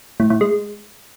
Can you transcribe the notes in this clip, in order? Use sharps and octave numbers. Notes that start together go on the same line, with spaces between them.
A2
A2
G#3